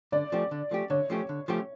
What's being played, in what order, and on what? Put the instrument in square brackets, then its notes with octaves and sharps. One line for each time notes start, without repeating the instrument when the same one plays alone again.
[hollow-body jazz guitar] D3 [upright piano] D5
[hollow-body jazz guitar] F3 A3 C#4 G4
D3
F3 A3 C#4 G4
[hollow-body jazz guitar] D3 [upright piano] C#5
[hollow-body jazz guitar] F3 A3 C#4 G4
D3
F3 A3 C#4 G4